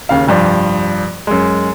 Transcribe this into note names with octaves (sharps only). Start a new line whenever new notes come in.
D#2 C#3 F5
F1 G2 F3 D5
F#2 G#3